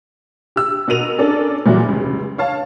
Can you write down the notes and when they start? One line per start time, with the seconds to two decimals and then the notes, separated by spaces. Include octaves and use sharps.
0.56 G4 E6
0.88 B2 F#4 A#4 D#7 F7
1.18 C#4 D4 A4 A#4 D5
1.66 A#2 E3 F#3 G3 E4 F#4
1.84 F1 C#2
2.38 C#5 F5 A5